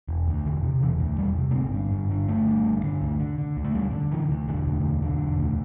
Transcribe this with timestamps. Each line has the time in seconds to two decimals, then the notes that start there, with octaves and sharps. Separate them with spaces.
0.09 E1
0.28 D2
0.46 E1 D3
0.64 C3
0.81 E1 E3
1.00 D2
1.18 E1 G3
1.37 C3
1.51 A3
1.55 G1 C4
1.73 G2
1.92 G1
2.10 D3
2.28 G1 A3
2.47 G2
2.65 G1
2.83 D3
3.02 D2
3.20 D3
3.38 D3
3.57 D2
3.65 A3
3.74 D2 G3
3.93 D3
4.11 D3 E3
4.29 D2
4.48 E1 D3
4.66 D2
4.85 E1
5.02 D3
5.22 E1
5.39 D2